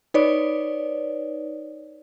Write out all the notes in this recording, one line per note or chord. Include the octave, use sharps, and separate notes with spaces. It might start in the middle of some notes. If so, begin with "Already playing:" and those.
D#4 B4 C#5 D5